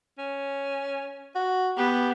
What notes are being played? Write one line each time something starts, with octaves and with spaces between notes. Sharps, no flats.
C#4
F#4
B3 G4